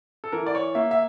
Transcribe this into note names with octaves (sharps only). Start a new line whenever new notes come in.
A4
E3 A#4
D5
C#5
A#3 E5
E5